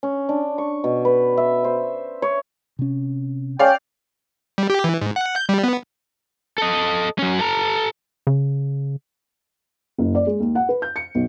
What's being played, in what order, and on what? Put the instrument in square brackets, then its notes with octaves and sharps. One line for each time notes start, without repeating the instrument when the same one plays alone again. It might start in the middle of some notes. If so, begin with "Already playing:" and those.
[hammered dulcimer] C#4
D4
C#6
B2
B4
E5
C5
C#5
[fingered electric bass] C3 C#4
[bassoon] C#4 [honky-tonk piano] D5 F5 [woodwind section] G5
[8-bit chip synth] G3
G4
E3
G#2
F#5
G6
G3
B3
[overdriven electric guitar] A4 D#5
F#3 C#4
A4 A#5
[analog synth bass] C#3
[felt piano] F#1
D5
G#3
D#2
F#5
B4
G6
C#7
B1